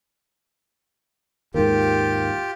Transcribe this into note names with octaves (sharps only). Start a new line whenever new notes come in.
D#2 G#2 F4 G4 A#4